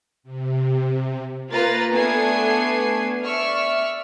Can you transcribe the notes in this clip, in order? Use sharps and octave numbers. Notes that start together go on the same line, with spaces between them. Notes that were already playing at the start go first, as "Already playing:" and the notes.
C3
A#3 F4 B4 A#5 A6
A3 B3 D4 G#5 G#6 C7
D5 E5 C#6 E6 F6